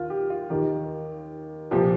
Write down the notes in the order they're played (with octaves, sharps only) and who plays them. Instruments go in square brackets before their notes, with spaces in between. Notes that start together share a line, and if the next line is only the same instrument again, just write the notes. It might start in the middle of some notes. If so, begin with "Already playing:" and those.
Already playing: [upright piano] D#2 F4
G4
F4
D#2 D#3 G4
C2 A#2 F3 G4